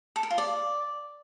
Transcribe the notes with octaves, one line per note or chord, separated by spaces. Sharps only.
A4
A#4
F4
D5